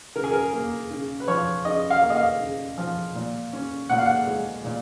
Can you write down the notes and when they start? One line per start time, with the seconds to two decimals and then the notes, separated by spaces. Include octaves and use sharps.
0.15 C#3 A#4
0.24 G#4
0.31 A#4
0.53 A#3
0.91 C#3
1.20 B4
1.28 F3 C#5
1.65 C#3 D#5
1.90 F5
2.02 A#3
2.10 D#5
2.15 F5
2.40 C#3
2.78 F3
3.15 A#2
3.53 C#4
3.89 A#2 F#5
3.98 F5
4.06 F#5
4.27 G#3
4.65 A#2